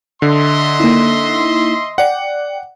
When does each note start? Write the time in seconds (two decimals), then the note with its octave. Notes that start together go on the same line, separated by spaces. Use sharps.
0.22 D3 D#5 E5 C6
0.80 A#3 D#4 E4
1.98 D5 F#5 G5